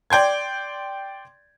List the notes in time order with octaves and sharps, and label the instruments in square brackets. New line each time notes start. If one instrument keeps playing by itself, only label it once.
[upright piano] D5 G5 C6 G#6